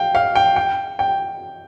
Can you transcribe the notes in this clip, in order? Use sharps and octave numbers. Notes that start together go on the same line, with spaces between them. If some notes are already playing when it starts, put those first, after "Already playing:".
Already playing: F5 G5
F5
G5
G5
G5